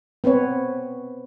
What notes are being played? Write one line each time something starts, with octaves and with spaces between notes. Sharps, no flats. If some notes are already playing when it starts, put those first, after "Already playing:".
B3 C4 B4 C#5